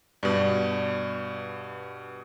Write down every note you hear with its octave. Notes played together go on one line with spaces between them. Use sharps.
G2 B2 D5 F#7